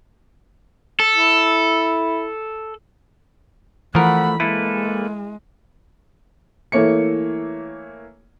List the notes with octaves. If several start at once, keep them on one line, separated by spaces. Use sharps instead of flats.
A4
E4
E3 F3 A3 A#4 F#5 B5
G#3 A#3 E4 A4 B4
E3 A3 A#3 C#5 C#7